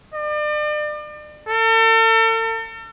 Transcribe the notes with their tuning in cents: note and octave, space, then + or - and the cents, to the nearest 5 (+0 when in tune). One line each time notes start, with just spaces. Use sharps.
D5 +40
A4 +40